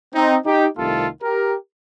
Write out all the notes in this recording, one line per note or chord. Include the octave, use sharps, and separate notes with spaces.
C4 D#4
D#4 G4
C2 C3 D#3 A3 F4 A4
G4 A#4